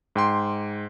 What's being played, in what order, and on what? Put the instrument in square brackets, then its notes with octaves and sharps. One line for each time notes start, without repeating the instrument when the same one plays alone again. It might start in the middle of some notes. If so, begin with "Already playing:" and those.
[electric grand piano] G#2 G5 C6